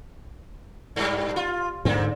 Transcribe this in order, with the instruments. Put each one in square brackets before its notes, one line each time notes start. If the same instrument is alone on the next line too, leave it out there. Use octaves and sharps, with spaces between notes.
[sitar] G2 G3
F4
[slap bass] G#2 D3 [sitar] A#3 C4